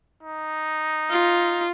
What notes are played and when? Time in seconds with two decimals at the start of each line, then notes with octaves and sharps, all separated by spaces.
0.23 D#4
1.11 F4